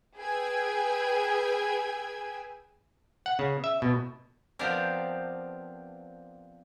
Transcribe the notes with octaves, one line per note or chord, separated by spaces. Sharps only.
G#4 B4 G5 G#5 E6 G#6
F#5
C#3
E5
B2
F3 B3 C4 D4 G4 A#4